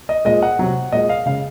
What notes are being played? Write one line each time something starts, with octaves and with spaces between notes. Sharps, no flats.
D#5
A#2 F3 G#3 D#5
F#5
C3 F#3
A#2 G#3 D#5
F5
C#3 G#3 F5